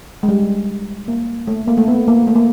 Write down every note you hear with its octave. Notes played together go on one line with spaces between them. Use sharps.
G#3
G3
A#3
A3
A#3
A3
B3
A#3
A3
A#3